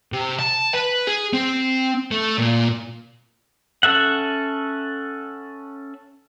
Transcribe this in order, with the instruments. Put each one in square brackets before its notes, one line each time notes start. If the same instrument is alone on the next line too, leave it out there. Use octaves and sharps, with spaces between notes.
[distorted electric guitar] C3
A5
B4
G#4
C4
A3
A#2
[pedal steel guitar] C#4 A4 E5 F#5